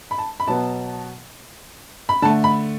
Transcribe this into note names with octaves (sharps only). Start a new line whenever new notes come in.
B5
A5
B5
B2 F#3 B3 A5
B5
D3 A3 A5
B5